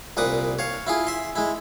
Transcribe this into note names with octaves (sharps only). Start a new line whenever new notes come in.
C2 A#2 B4 D6 D#6
C#5 F5
E4 F4 G#4
E5 C6
G#3 E4